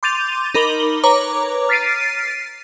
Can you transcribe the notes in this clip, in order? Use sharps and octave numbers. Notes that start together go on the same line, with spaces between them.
C6 D6 G6 A6 D#7 F7
D#4 A#4 B5 D6 F#7 G7
B4 C#5 A#5 D6
F6 A6 B6 C7 D7 D#7